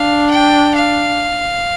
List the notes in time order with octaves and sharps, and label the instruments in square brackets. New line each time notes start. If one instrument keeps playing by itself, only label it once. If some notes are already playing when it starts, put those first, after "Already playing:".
Already playing: [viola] D4 [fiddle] F5
[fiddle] G5
F5